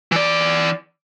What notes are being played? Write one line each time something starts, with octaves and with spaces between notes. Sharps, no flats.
E3 D5